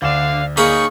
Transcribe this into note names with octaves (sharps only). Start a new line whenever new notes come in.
D2 D3 D4 D5 F5 E7
A#3 D#4 G#4 C#5 B5 C#6